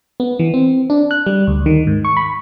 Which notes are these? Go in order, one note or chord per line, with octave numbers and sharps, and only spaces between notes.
B3
E3
C4
D4
F#6
G3
D2
D#3
G#2
C#6
B5